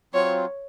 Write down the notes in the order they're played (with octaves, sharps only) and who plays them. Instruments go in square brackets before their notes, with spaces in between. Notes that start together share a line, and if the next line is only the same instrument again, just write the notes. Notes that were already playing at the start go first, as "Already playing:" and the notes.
[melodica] F#3 C4 F4 [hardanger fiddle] C#5